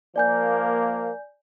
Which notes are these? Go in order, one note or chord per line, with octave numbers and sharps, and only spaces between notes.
F3 A#3 D5 G#5 G6